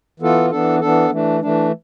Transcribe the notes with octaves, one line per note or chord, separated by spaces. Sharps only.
E3 B3 F4 A4
E3 B3 D4 A4
E3 B3 D4 A4
E3 A3 D4
E3 A3 D4